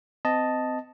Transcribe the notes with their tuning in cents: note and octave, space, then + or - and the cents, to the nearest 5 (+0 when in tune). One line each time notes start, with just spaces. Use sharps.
C4 -30 D#5 +0 A5 +0